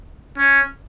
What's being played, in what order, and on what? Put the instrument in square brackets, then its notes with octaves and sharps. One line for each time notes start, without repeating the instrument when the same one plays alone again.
[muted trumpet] C#4